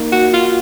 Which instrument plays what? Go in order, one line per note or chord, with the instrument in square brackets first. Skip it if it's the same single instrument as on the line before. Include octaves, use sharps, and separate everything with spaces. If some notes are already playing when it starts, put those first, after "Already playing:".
Already playing: [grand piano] A#3 D#4
[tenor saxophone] F#4
[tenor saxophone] F4 [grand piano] F#4